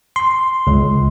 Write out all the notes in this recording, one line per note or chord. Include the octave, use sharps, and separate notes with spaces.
C6
C#2